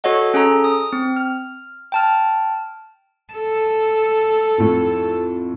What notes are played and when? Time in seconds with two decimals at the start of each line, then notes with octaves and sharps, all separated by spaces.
0.04 F#4 A4 C#5 D#5 F#5
0.34 C#4 G#4 A4 A#5
0.64 D#6
0.93 C4
1.16 F6
1.92 G5 A5 F6
3.33 A4
4.58 F2 A2